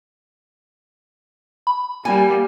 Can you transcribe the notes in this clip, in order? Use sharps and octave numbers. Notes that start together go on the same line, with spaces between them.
B5
G3 A#3 G#5